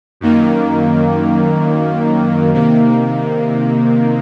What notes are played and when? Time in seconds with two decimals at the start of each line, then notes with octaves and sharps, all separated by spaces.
0.21 F#2 D#3 A#3
2.53 C3 D#3 A#3